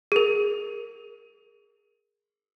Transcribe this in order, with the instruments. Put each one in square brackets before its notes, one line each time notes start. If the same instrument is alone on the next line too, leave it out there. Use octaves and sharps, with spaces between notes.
[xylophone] G#4 A#4